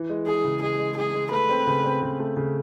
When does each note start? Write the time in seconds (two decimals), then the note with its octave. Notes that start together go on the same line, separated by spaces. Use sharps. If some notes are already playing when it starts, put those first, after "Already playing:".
Already playing: E3
0.10 G#3
0.27 E3 G#4
0.44 C#3
0.62 G#3 G#4
0.79 G#3
0.97 G#3 G#4
1.14 G#3
1.31 A3 B4
1.50 C4
1.67 C#3
1.84 C4
2.02 C#3
2.20 A3
2.37 C#3